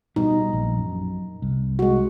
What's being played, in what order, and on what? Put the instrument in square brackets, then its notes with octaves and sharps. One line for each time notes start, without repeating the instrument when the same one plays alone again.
[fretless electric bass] B2 G3 [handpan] D#4
[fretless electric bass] A#1
F#2
C2
[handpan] G#3 F#4